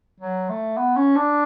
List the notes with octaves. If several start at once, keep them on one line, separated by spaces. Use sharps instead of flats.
F#3
A3
B3
C#4
D4